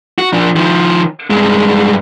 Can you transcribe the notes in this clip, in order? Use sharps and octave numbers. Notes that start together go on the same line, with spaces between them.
F#4
F3 D4
D#3 F3
G2 G#3